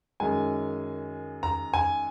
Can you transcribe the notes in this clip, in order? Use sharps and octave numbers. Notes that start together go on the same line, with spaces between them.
F#2 D#3 G#3 G#5
A#5
G#5